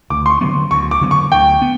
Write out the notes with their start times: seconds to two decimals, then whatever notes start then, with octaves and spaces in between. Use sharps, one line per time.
0.10 D2 D6
0.26 C6
0.30 C#6
0.41 D3 F#3 B3
0.71 D2 C#6
0.91 D6
1.01 D3 F#3 B3
1.11 C#6
1.31 D2 G5
1.62 B3